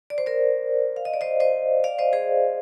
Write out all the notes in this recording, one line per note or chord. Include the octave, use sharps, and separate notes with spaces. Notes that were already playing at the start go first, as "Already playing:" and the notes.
D5
C5
A#4 D5
F5
D#5
D5
C5 D#5
C5 D#5
D5 F5
C5 D#5
G#4 C5